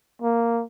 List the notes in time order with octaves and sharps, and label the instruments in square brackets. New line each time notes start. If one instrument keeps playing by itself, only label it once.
[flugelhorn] A#3